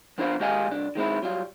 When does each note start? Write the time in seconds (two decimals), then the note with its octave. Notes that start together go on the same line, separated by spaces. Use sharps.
0.18 F3 B3 D4 F4 C5 F5
0.40 D#3 G#3 G4 D#5 F5 G#5
0.67 C2 D4
0.95 D#3 G#3 C4 E4
1.23 F#3 G3 F4